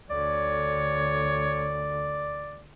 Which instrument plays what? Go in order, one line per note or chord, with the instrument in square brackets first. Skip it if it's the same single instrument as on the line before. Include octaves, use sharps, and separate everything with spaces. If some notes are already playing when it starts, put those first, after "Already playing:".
[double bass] D2 D3 [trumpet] C#5 [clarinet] D5